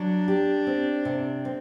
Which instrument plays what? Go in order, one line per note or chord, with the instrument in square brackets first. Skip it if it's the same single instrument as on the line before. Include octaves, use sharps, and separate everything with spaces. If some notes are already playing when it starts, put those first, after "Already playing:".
Already playing: [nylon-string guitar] F#3 [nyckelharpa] D4
[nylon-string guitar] G4
C4
C3
C4